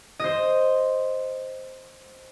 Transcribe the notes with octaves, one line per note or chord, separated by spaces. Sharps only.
C5 D#5